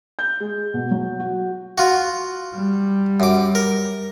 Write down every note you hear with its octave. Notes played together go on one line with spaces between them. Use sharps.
G6
G#3
B2
F#3
F#4
F4 F#4
G3
F#2 D6
A#4